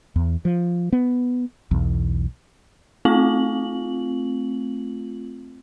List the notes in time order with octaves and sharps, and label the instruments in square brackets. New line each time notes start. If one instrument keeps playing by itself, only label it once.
[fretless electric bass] E2
F3
B3
B1 E2
[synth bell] A3 C4 F4 F#7